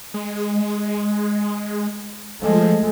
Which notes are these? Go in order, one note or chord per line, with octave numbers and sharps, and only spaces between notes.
G#3
F3 G#3 A3